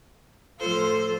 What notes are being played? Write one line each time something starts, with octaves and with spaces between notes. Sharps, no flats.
A2 F3 F4 A4 C5